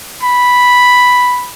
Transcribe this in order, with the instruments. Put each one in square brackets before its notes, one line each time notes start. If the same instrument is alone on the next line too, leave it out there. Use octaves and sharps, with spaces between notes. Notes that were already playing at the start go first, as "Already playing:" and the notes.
[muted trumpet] B5